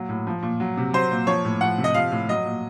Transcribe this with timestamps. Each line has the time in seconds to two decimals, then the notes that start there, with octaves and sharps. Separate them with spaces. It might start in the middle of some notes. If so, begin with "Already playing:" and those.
Already playing: A#2 F#3
0.09 A2
0.27 F3
0.43 A#2
0.60 F#3
0.77 C3
0.93 F#3 C5
1.11 A#2
1.27 F3 C#5
1.44 A2
1.61 F3 F#5
1.78 C3
1.84 D#5
1.94 F3 F5
2.12 A2
2.29 F#3 D#5
2.46 A#2